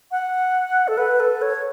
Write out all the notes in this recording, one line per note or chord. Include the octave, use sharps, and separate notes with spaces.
F#5
A4
B4
A4
C#5